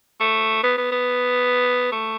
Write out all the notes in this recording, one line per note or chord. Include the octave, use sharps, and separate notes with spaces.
A3
B3
B3
B3
A3